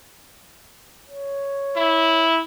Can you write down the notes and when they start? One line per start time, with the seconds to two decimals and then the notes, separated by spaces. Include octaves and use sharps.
1.08 C#5
1.76 E4